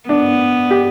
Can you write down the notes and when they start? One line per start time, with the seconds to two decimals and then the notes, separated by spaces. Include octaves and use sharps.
0.09 B3 D4
0.71 G4